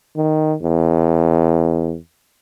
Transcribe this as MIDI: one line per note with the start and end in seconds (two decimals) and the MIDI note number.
0.16 0.54 51
0.62 1.97 40